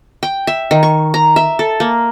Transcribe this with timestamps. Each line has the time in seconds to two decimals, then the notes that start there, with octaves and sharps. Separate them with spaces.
0.23 G5
0.47 E5
0.71 D#3
0.83 C#6
1.14 A#5
1.36 E5
1.59 A4
1.80 A#3